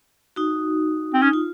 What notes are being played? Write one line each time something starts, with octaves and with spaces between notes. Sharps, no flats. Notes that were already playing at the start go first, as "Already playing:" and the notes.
D#4 F#4
C4
C#4 D#4
F4